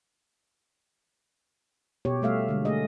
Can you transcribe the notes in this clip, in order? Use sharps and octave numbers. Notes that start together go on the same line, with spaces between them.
B2 G4 C#5
G3 A3 E5 F5
D3 G#3
A3 G#4 D#5